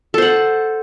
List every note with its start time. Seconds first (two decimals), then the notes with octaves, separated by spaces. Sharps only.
0.14 A4
0.18 C5
0.22 F#5